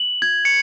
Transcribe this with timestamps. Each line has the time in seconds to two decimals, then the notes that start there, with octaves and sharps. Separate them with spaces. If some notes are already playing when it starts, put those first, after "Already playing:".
Already playing: F#7
0.22 G#6
0.45 C#7